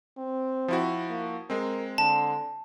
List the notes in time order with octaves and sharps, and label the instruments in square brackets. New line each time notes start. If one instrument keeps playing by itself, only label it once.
[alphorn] C4
[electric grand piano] F3 E4 F#4
[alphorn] A#3
[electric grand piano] G#3 C4 [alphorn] A#4
[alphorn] D3 [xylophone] A5